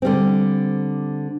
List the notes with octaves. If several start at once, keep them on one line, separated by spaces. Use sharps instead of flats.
D3 G3 C4